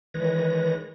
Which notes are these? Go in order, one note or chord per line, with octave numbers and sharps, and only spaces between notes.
D#3 E3 G#3 B4 C#5 A#6